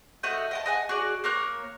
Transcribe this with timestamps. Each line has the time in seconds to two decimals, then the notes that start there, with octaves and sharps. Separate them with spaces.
0.23 A3 F#4 D#5 G6
0.51 D#5 G5 A5
0.66 D#5 F#5 G#5
0.89 F#4 G#4 D5
1.24 A#3 A#4 C#5 F#6